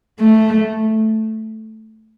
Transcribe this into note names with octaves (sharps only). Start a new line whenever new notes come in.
A3